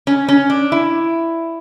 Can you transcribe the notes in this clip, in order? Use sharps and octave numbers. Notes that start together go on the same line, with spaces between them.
C#4
C#4
D4
E4